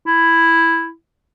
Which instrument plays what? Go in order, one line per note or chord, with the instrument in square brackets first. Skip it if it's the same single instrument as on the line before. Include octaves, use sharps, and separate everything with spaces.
[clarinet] E4